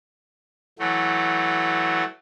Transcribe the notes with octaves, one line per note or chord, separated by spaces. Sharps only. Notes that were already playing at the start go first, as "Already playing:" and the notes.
E3 F#3 A3